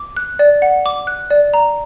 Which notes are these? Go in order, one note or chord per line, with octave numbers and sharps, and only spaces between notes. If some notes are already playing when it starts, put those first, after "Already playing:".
Already playing: D6
F#6
D5
F#5
D6
F#6
D5
A#5